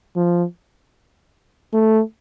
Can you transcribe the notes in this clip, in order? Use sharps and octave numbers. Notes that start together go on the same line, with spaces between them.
F3
A3